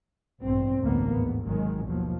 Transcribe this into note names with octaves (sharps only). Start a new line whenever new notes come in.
A1 G2 B2 C4
A1 D2 G2 D3 A#3 B3
D#2 G#2 B3
G#1 D#3 F#3 G#3
D#2 B2 F3 F#3